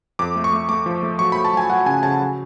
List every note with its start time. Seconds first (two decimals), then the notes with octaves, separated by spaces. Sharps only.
0.19 F2 D6
0.36 A3
0.44 C#6
0.53 A3
0.69 A3 D6
0.86 F3
1.03 A3
1.19 F#3 C#6
1.32 A3 B5
1.45 A5
1.53 F#3 G#5
1.69 F#3 F#5
1.86 C#3 G#5
2.03 C#3 A5
2.20 F#3